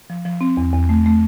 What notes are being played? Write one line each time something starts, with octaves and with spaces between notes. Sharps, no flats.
F3
F3
C4
E2
E2
A3
A3